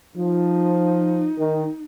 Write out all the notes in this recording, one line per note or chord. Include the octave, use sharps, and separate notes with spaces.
F3 D#4
D#3